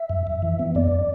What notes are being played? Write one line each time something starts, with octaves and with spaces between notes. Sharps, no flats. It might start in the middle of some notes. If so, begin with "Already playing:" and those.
Already playing: E5
F#2
F#2
E3
B3
F#2 D5